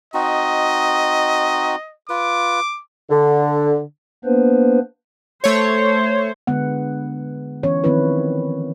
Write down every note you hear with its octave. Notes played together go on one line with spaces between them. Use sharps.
C4 D#4 F#4 D#5
F4 B4 D6
D3
A#3 B3 D4 B4 C5
A3 C5 C#5
D3 G#3 B3 F#5
E3 B3 C#4 C#5
D#3 F3 B3 C4 E4 B4